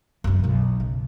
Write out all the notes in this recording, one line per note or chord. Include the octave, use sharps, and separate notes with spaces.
F#2 F#3
B1 B2
C#3